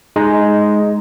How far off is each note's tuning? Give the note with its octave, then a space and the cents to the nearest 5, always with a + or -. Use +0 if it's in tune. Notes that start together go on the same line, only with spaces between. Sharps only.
G#3 +5 D#4 +0